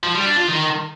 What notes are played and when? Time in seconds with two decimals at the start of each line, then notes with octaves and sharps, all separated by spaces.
0.03 F3
0.14 G3
0.26 D4
0.37 F4
0.48 D#3